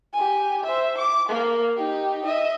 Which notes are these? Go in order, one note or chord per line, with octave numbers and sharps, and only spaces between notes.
G4 G#5
C5 E5
D6
A#3 A#4
D#4 G4
D#5 E5